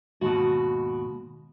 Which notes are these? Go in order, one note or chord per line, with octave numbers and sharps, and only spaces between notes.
D#2 G#2 B2 F#4 A5